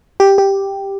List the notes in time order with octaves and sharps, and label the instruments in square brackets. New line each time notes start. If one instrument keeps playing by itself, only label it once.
[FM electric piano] G4
G4